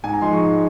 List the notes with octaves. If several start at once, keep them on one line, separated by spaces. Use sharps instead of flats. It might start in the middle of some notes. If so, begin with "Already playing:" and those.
G#2 G#5
A#5
F3 G#3 D#4 C6
C#6
G#2